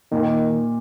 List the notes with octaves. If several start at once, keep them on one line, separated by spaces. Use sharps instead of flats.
A#2 D#3